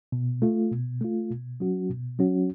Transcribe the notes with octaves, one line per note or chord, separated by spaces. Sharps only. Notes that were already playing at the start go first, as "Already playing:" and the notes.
B2
A3 F4
B2
A3 F4
B2
F#3 C#4 F#4
B2
F#3 C#4 F#4